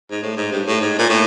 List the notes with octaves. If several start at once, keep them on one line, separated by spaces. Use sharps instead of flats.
G#2
A2
G#2
G2
A2
G#2
A#2
A2